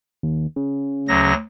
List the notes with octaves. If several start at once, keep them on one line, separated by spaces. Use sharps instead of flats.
D#2
C#3
D2 F#3 A#6